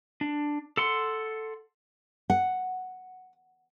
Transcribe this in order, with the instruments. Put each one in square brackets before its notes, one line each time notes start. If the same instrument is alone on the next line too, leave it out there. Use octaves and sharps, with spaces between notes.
[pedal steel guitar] D4
A4 F#5 C6
[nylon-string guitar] F#5